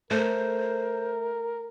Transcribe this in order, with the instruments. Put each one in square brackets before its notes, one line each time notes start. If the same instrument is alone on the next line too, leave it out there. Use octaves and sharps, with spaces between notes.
[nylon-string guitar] A3 [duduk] A#4 [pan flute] C5